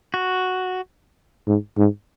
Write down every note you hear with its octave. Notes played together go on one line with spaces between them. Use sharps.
F#4
G#2
G#2